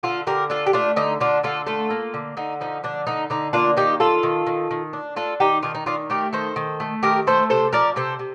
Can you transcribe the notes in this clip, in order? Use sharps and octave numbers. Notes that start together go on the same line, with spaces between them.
D3 F4 A4
D3 G4 A#4
D4 F4 A4
G4
A3 D4 F4
D3 D#4
D3 D4 F4
D3 F4 A4
A3 F4 A4
A#3
D3
D3 D#4
F3 D#4
D3 D4
D3 D#4
D3 D#4
A#3 D4 F4
D#3 D#4 G4
D#3 F4 A4
D#3
D#3
D#3
D4
D4 F4 A4
D#3 D#4 G4
D#3 D4 F4
D#4
D#3 D4 F4
A3 G4 A#4
D#3 A4 C5
D#3
A3
D#3 G4 A#4
A3 A4 C5
C3 A4 C5
F3 A#4 D5
C3 A4 C5
C3